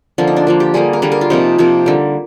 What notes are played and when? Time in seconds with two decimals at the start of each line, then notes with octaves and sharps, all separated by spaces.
0.18 D3 F3 A#3 F4
0.27 D#4
0.36 D4
0.47 D3 F3 A#3
0.60 G4
0.74 D3 G3 A#3 G#4
0.93 A#4
1.02 D3 G3 A#3 G#4
1.12 A#4
1.21 F4
1.30 C3 F3 A#3 D#4
1.58 C3 F3 A#3
1.86 D3 G3 A#3